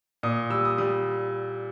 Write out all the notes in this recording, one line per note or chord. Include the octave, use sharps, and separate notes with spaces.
A#2 D#6
G3 E6
D#6
G3 D#6